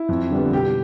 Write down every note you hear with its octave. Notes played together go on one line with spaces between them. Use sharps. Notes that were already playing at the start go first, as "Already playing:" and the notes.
Already playing: E4
F2
D3 G3 B3
B2 G4